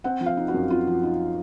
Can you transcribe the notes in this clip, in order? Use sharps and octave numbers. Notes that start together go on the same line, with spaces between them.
C4 F#5
F3
F5
D#4
F#4
F#2
C4 F4
F3
D#4